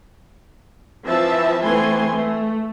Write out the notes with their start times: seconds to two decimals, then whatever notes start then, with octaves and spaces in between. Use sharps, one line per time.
1.06 E3 F3 C4 E5 A5
1.64 E3 A3 B3 C4 G#5 C6
2.13 A3